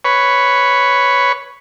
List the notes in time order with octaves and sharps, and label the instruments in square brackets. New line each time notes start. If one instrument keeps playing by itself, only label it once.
[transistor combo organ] B4 C#5